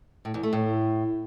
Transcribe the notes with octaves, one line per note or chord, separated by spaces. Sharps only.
A2
E2
A3
A2